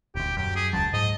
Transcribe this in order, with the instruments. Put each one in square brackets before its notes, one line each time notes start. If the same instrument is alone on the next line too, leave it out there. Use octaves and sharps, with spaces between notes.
[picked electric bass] D#1 D2 [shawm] G4
[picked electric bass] F#2 [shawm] G4
[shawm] G#4
[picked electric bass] D#1 C#2 F#3 [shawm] A5
[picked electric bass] G#2 [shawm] D#5